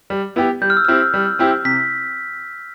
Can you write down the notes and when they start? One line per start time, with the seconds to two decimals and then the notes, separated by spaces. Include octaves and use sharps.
0.10 G3
0.36 B3 E4 G4
0.62 G3 G6
0.70 F6
0.77 E6
0.85 C4 E4 G4 F6
1.14 G3
1.39 C4 E4 G4
1.65 C3 B6